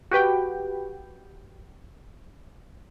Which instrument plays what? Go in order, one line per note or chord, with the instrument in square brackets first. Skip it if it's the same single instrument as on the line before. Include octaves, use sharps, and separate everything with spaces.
[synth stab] F#4 G4 B4 G5